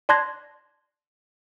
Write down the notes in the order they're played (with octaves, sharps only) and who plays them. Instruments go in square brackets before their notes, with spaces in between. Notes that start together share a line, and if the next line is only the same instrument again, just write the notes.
[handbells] D5 A5 C6 F#6 G#6 A#6